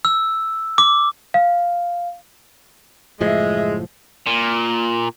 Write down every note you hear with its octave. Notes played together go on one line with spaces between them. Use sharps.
E6
D6
F5
F#1 A2 F3 G#3 D#5 E5
A#2